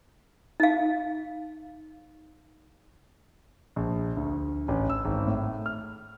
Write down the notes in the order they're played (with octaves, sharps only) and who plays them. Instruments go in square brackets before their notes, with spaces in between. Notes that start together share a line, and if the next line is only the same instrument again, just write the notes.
[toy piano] D#4 F5
[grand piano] A#1
D2
A1
E6
G#1
A2
F6